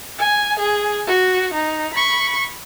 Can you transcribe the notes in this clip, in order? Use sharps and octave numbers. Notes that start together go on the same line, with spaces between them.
G#5
G#4
F#4
D#4
B5 C#6